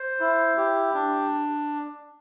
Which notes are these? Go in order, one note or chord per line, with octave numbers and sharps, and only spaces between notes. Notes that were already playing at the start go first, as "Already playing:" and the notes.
Already playing: C5
E4
G4
D4